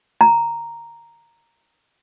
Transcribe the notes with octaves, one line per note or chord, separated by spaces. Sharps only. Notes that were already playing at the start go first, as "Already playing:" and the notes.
A#5